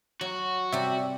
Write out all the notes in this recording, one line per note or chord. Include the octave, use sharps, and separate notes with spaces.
F#3 F#4
C3 G3 C#5 D5 E5